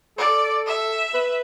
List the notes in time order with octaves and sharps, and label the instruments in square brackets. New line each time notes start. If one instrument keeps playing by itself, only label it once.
[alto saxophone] A4 [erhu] D5
[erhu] E5
[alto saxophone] B4